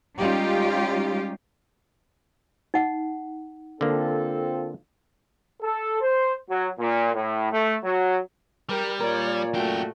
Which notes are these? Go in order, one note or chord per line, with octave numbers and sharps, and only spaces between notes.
G3 G#3 C#4 D#4 F4 G4
D#4 F#5
D3 A#3 C4 F4 A4
A4
C5
F#3
A#2
A2
A3
F#3
G3 G4 A#4
A#2 A#4 C#5 D5
F#2 A3 F#4 G5